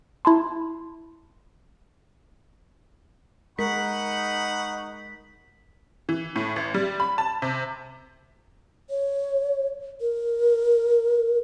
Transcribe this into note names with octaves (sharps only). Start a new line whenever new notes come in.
E4 A5 C6
G#3 D#4 A#4 F#5 B5 C#6 B6
E3
A2
A1
G3
B5
A5
C3
C#5
A#4